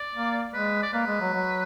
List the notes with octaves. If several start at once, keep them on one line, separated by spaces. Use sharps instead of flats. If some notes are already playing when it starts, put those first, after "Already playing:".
Already playing: D5
A#3
G#3 B4
D5
A#3 B4
G#3
F#3
F#3